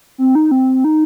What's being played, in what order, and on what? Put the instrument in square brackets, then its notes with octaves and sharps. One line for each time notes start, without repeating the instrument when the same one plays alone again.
[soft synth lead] C4
D#4
C4
D#4